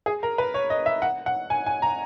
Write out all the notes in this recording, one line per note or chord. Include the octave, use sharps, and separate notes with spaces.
G#4
A#4
B4
C#5
D#5
E5
F#5
F#5
G#5
G#5
A#5